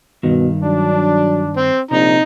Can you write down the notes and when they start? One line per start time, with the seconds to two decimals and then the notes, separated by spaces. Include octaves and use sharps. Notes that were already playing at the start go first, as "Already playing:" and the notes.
0.23 G2 B2 D#3
0.63 F#3 D4
1.57 C4
1.91 A#1 C3 D#4 A#5